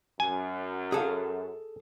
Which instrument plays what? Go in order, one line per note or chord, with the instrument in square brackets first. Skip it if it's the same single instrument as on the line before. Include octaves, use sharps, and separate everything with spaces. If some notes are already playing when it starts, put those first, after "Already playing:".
[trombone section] F#2 [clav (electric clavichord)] G#5
[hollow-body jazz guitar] G#4 A4 F5